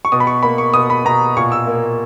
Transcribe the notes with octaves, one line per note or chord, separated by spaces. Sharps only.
C#6
B2 D#6
B5
C#6
A#3 B5
C#6
B2 D#6
B5
B2 A#5
A#2 C#6
E6
A#3